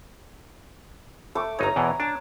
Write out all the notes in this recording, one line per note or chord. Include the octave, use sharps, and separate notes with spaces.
A3 C#6 D6
G1 D#4 C#5 A#5
E2 B2 E3
D4 A5